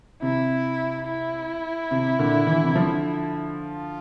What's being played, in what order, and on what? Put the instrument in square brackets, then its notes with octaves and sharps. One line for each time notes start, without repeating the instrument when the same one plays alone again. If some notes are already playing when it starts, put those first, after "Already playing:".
[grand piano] C3 [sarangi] E4
[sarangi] E4
[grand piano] C3
A#2 D3
E3
D3
C3 E3
D3 F3
[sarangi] F4